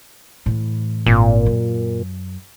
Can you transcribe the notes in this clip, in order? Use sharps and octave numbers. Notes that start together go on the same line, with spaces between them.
A2 E3
G#1 A#2
F#2